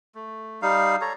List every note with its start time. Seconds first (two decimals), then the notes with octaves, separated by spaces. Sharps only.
0.15 A3
0.62 G3 D#4 F5
1.01 A4 C#5 A#5